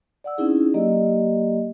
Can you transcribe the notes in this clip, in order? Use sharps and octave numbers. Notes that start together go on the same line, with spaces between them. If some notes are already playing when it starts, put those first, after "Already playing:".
D5 F#5 E6
C4 C#4 D#4 E4 G#4
F#3 A#3 G4 D5 D#5